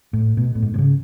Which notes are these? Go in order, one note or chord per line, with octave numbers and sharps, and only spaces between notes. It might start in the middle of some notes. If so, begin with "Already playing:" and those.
A2
B2
A2
G#2
B2
C#3